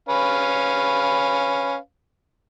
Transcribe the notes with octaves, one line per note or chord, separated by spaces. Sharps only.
C#4 B4 F5